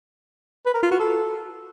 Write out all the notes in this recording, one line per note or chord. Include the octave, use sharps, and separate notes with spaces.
B4
A#4
F4
F#4
A4